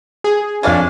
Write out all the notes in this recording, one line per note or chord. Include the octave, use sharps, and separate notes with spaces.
G#4
F2 F3 C#4 D4 D5 F5 G#5